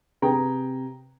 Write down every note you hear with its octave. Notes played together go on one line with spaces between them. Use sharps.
C3 G#4 B4 G5 A#5